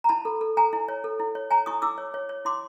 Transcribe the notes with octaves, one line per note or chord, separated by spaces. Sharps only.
A#5
E4 A5 B5
A4
A4
A4 G#5 A#5
E4
C#5
A4
E4
C#5
C#5 G#5 A#5
E4 C#6 D#6
E4 D6 E6
C#5
C#5
C#5
E4 C6 D6